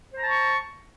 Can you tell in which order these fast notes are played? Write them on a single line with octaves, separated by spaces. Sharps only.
C5 A#5 A5 C#6